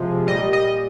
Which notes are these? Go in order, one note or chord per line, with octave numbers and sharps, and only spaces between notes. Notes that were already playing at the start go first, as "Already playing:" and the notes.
Already playing: C3 F3 G#3
A#2 G3 D#5
D#5